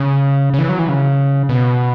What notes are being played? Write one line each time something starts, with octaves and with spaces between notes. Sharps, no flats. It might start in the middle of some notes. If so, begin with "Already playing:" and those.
Already playing: C#3
C#3
E3
F#3
E3
C#3
B2